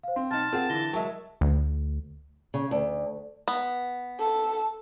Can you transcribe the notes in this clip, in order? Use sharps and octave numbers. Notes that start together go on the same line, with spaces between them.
C5 F5
C4 C6
B1 D#4 A5 C6 F6 A6
C4 F4 G#4 A#4 F#5
D3 E3 E4 A#6 G7
F#3 G#3 A#4 E5 A5
D2
C#3
D2
B3
A4